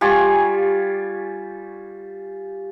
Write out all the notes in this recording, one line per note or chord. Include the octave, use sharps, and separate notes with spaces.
G3 F4 G#5 C#6